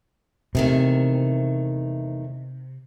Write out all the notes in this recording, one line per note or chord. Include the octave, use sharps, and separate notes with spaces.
E2 C3 D#3 A3